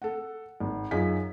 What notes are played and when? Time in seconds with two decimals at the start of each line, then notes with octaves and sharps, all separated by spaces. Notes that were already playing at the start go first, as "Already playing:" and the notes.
0.02 A4 F#5
0.60 G#1
0.91 F#2 D#4 F4 G#4 B6